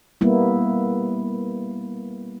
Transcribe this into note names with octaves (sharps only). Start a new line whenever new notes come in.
G3 A#3 B3 E4